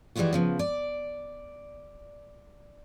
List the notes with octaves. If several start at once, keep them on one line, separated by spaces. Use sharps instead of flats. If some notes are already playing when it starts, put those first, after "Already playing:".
E3 G3 G#3 B3 F4 F#4
C#3 F3 B3
D5